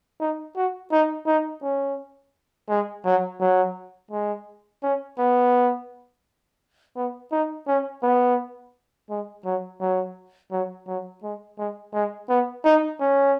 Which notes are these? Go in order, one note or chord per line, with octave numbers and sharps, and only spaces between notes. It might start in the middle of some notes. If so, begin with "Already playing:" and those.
D#4
F#4
D#4
D#4
C#4
G#3
F#3
F#3
G#3
C#4
B3
B3
D#4
C#4
B3
G#3
F#3
F#3
F#3
F#3
G#3
G#3
G#3
B3
D#4
C#4